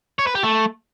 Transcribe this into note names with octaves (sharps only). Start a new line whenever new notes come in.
C#5
B4
G4
A3